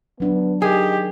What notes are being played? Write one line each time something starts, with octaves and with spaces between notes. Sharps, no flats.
F#3 B3 D4
D#3 G4 G#4